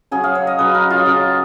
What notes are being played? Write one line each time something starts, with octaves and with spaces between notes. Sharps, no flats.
C#3 F#3 C#4 G#4
F5
C#5
D#5
C#3 F#3 C#4 B4
A#4
F4
C#3 F#3 C#4 F4